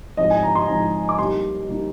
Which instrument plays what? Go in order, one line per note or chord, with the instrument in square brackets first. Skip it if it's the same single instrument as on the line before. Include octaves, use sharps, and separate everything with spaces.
[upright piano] G#2 F3 C4 D#5
G#5
A#5
C6
G#2 F3 C4 A#5
D6
C3 G3 A#3 D#4 C6
C3 G3 A#3 D#4